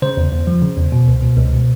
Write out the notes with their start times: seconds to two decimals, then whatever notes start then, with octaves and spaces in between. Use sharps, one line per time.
0.02 C#3 C5
0.17 E2
0.32 E2
0.47 F3
0.62 C#3
0.77 E2
0.92 B2
1.08 C#2
1.22 B2
1.37 C#2
1.53 B2